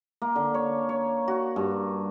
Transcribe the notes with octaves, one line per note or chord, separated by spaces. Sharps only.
A#3
D3
C#5
C#5
F#4
G2